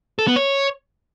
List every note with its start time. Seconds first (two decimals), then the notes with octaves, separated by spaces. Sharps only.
0.19 A4
0.27 B3
0.36 C#5